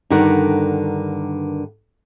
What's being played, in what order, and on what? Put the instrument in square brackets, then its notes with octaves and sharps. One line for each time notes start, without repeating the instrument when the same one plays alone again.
[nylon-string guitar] G2 D3 D#3 A#4 F#5